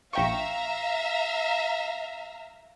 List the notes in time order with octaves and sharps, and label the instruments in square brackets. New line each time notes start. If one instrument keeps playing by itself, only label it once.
[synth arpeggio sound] A#1 G5 C#6 [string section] E5 F5 A#5